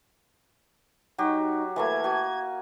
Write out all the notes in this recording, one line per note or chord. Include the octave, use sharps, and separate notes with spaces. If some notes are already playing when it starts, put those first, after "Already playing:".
F#3 D#4 F#4 G4
E3 A3 A#3 G#6
F#4 G#5